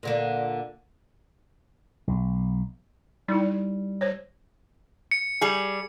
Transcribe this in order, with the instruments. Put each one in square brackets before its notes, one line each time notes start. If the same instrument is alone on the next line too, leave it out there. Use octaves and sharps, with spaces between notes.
[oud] A#2 D3 A#3
[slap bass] B1
[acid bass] G3 [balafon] D#4 E4
[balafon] C5 C#5
[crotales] C#7
[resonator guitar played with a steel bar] G3 G#4